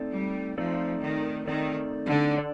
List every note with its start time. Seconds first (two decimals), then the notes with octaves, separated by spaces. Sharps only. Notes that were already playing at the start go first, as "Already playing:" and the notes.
Already playing: A3 C4 D#4 A4 D5
0.13 G3
0.57 F3 A3 C4 D#4 A4 D5
1.02 D#3
1.47 D#3 A3 C4 D#4 A4 D5
2.08 D3
2.38 A4 D5